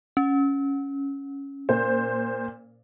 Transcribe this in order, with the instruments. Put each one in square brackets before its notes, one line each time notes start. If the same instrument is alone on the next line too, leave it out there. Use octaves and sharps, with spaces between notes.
[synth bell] C#4
[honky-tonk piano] A#2 C5